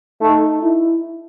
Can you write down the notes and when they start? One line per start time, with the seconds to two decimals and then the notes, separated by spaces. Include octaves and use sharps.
0.21 A3 D#4
0.62 E4